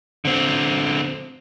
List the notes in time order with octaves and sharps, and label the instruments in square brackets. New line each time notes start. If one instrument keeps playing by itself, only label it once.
[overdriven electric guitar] D3 C4